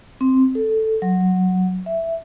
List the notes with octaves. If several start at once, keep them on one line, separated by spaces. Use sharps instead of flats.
C4
A4
F#3
E5